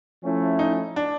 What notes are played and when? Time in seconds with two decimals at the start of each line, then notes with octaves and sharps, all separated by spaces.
0.22 F3 A3 C#4 E4
0.59 D#4
0.96 D4